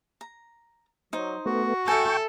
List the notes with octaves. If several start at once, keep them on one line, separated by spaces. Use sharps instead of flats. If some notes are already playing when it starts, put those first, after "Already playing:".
A#5
F#3 D#4 C5
A3 B3 F#4
A4 E5 G5 G#5 C#6